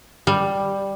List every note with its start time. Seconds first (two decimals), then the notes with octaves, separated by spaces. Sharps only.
0.27 G3